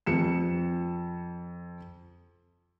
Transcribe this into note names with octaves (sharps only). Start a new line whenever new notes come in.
F2 C#7 E7